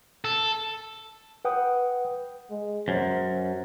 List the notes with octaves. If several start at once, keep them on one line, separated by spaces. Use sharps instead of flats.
A4
B4 F#5 G5 D#6
G#3
F#2 C5